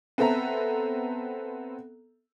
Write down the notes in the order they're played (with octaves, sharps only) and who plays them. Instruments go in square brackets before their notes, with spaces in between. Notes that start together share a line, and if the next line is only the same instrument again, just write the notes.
[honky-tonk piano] B3 C4 A4 E5 A#5